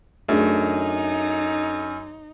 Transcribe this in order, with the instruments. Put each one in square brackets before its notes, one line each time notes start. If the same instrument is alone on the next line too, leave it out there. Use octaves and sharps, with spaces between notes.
[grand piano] F#2 [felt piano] A3 D4 G#4 [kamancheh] D#4